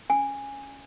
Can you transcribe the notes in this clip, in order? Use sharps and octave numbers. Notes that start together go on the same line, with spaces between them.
C#4 G#5